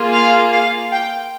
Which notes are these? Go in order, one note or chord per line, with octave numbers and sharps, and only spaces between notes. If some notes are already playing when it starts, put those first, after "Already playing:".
Already playing: A#3 F4 G#4
F5
F5
G5